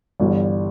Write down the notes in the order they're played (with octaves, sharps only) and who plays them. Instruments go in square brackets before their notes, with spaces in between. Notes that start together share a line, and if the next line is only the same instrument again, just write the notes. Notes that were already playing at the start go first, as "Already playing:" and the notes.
[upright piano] G1 G2 E3 G3